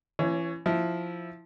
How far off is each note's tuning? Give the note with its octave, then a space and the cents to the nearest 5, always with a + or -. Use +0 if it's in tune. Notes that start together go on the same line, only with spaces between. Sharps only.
E3 +35 C#4 -15 C#5 +5
F3 +0 E4 +0